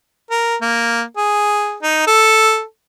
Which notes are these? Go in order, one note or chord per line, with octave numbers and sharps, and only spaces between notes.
A#4
A#3
G#4
D#4
A4